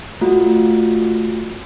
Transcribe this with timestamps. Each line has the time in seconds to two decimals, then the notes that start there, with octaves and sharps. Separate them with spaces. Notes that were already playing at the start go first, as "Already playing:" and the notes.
0.21 A3 F4 F#4